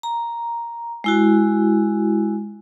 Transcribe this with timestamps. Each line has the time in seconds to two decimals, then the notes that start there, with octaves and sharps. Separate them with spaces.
0.03 A#5
1.04 G#3 E4 F#4